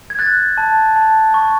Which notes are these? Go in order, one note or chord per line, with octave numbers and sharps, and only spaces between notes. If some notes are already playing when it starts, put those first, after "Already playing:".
G#6
F#6 A6
A5
A5
C#6